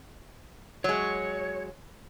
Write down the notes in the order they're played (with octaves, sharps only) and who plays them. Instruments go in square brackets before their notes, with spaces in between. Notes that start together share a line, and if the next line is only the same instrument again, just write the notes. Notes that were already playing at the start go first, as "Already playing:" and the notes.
[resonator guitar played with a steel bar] F#3 G#3 [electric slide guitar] C#5